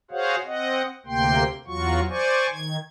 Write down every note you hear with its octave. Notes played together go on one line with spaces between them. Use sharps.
F#4 G#4 C5 C#5 F5 F#5
C4 D#5 F#5
D2 C3 A#3 G5 C6
E2 F#3 F4 F#4 C#6
C5 D5 G#5 C#6
D#3 G#6